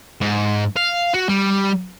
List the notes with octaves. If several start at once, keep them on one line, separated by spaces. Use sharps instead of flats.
G#2
F5
F#4
G3